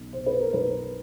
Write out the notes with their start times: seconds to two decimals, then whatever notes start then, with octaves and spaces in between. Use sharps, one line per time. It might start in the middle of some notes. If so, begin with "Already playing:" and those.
Already playing: B1 B2
0.13 B2 C5
0.26 B4
0.40 A#4
0.53 B1 B4